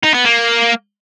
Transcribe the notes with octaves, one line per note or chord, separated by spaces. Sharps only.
D#4
B3
A#3